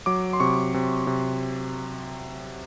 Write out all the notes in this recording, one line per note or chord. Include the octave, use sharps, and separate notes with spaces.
F#3 D6
C6
C3 C#6
C3
C3